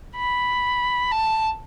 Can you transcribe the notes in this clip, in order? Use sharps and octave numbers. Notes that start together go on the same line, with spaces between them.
B5
A5